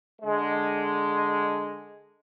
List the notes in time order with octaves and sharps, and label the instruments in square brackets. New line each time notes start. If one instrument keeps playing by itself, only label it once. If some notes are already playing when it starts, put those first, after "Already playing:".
[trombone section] D3 G#3